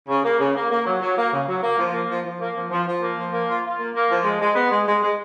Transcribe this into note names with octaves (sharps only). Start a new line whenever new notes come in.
C#3
A#3
C#3
A#3
A#3
F#3
F#3
A#3
C#3
F#3
A#3
F3
A#3
F3
F3
A#3
F3
F3
F3
A#3
F3
A#3
F4
F4
A#3
A#3
F3
G#3
G#3
B3
G#3
G#3
G#3